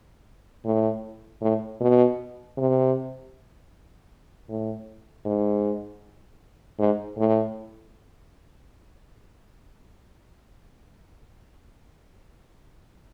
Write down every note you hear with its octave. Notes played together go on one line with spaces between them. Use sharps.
A2
A2
B2
C3
A2
G#2
G#2
A2